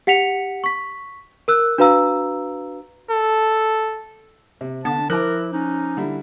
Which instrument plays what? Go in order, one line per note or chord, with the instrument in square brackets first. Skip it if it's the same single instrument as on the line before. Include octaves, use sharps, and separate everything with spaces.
[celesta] G4 F#5 B6 C#7 F7
C#6 B6
A#4 E6 F#6
D4 F#4 B4 F5 A#5 E6
[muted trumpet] A4
[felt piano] C3
[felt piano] D3 [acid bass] B3 [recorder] D4 [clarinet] A5
[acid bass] F3 [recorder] E4 [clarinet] A#4 [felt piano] D6 F#6
[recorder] C#4 [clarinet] D#4
[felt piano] D3 G3 E4